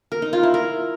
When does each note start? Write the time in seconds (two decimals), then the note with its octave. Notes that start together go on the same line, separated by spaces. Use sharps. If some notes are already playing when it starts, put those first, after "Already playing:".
0.12 A#4
0.22 D#4
0.33 F4
0.43 E4
0.54 A#4